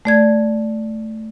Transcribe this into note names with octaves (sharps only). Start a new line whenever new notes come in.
A3 D5 G#6